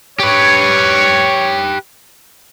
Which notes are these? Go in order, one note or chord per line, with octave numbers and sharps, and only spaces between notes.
G4 B4 C#5